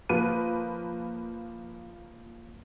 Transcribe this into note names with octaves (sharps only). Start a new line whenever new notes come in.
F3 A#3 B4 D#7